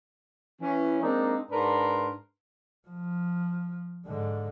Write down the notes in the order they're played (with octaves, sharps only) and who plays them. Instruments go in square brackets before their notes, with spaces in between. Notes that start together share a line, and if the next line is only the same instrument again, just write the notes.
[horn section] E3 C#4
G#3 A#3 C4 D4 D#4
G#2 D4 A#4 B4 C6
[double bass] F3
G#2 D3